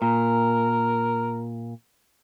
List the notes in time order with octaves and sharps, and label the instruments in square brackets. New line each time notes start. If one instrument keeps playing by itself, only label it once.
[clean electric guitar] A#2 [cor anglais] A#4